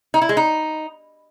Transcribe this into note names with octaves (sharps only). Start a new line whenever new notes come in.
D#4
E4
G#3
D#4